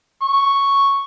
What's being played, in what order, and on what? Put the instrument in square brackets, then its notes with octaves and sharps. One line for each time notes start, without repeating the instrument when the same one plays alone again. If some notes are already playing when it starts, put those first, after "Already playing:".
[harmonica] C#6